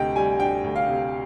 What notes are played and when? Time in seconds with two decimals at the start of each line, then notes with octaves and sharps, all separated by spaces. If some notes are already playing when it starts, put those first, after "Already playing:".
Already playing: D2 C3 D#5 G5
0.16 G3 G#5
0.40 D4 G5
0.64 D2
0.76 F5
0.88 C3